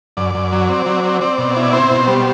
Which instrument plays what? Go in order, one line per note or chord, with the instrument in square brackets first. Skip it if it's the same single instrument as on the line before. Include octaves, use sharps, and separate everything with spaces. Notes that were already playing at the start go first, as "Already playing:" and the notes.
[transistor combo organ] F#2 D5
F#2
F#3
C4
F#3
C4
C4 D5
B2
E4
D5
C4 C5
B2
G3